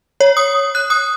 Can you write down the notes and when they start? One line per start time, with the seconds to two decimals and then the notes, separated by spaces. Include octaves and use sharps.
0.20 C#5
0.37 D#6
0.75 F#6
0.90 D#6